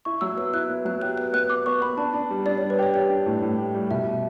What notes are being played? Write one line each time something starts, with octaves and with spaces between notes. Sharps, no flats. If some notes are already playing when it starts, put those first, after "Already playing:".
E4 C#6
F#3 E6
B3 E6
E4 F#6
B3
F#3 F#6
G4 F#6
B3 F#6
B3 F#6
B3 D6
B3 C#6
B3 B5
D4 A5
D4
G3
D4 D5
G3 C#5
B4
G4 C#5
G4 D5
D4
A2
A2
G4
G3
B2 E5